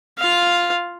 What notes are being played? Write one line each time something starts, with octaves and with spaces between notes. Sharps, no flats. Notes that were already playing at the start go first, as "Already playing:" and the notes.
F4 F5